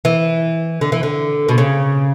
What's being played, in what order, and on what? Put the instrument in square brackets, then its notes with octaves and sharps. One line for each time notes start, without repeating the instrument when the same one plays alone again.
[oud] E3
D3
E3
D3
B2
C#3